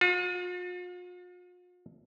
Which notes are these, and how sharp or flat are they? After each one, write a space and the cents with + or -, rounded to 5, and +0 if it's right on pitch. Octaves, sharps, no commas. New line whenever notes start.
F4 +45